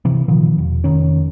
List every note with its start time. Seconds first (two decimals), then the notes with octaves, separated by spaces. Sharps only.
0.05 C3 E3
0.28 A#2 D#3 F3
0.58 E1
0.84 F1 D#3 C#4